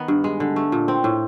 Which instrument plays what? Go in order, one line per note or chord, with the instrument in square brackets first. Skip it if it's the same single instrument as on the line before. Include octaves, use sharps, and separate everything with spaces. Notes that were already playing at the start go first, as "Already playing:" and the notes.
Already playing: [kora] D#3 B3
G2
G#3
D3
A3
A#2
C4
A2